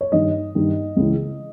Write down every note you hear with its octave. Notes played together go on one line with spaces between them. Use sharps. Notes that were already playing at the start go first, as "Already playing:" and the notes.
C#5
G2 D#3 D#5
G2 D#3
C#2 C#3 E3